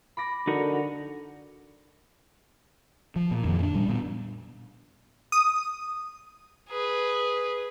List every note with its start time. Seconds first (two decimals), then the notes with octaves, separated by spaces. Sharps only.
0.17 B5 D6 A#6
0.47 D3 D#4 F#4 A#4
3.16 F3
3.31 A#2
3.45 F2 D#3 F3
3.62 D4
3.75 A#2 G3
3.89 A#2 B3
5.32 D#6
6.70 G#4 B4